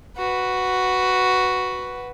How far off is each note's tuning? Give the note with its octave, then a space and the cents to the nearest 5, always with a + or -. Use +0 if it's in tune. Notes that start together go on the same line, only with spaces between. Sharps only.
F#4 +0 B4 +0